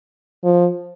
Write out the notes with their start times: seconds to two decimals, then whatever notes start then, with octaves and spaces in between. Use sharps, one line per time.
0.44 F3